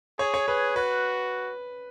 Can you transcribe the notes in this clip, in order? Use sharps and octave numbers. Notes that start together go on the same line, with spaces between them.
G#4 C#5
C#5
G#4 B4
F#4 B4